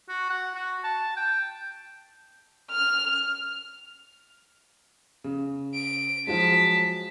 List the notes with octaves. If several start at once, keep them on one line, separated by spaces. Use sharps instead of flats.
F#4
F#5
F#4
A5
G5
F6
C#3
D7
F3 F#3 G#3 A5 B6